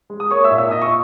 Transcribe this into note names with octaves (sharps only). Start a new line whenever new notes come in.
G#3
D#6
A#3 C#5 C#6
E5 E6
A#2
E5 E6
A#2 D#5 D#6
C#6